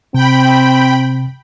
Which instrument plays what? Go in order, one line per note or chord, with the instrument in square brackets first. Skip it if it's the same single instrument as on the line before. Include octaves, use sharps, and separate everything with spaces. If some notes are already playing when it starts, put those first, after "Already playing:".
[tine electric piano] C3 [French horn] C4 [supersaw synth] G5 B5